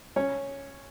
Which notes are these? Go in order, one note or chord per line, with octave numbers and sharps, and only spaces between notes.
C#4